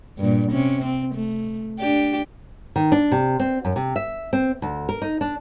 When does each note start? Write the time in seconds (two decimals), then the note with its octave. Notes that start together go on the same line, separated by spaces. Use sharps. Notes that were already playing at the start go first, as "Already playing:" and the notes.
0.18 G2 A#2
0.51 C3 C#4
0.85 C4
1.15 A3
1.79 D4 G4
2.76 D#3
2.92 D4
3.12 C3
3.40 C4
3.65 F#2
3.76 C3
3.96 E5
4.33 C4
4.62 D2
4.89 A#4
5.02 D#4
5.21 D4